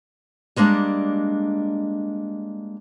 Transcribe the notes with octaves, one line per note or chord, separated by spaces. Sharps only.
G3 G#3 A#3 D4